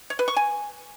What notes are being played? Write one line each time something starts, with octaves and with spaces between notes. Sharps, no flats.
C#5
B4
C#6
G#5